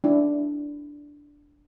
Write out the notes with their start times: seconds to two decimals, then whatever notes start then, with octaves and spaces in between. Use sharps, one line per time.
0.04 D4 E4